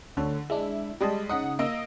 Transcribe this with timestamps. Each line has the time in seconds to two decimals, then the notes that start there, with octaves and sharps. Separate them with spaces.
0.17 D2 D3 A4 C#5
0.50 G#3 D4 E4
1.01 G3 G#3 G4 D#5 A5
1.29 C#3 D#4 F#5 D#6
1.59 A#3 D#5 E6